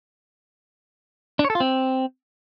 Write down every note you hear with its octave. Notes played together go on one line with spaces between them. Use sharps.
D4
C#5
A4
F4
C4